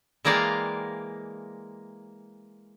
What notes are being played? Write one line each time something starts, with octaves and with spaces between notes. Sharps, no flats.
E3 G#3 A#3 D5 F5 G5